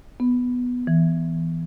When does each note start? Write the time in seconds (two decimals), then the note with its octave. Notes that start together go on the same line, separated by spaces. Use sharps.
0.20 B3
0.87 E3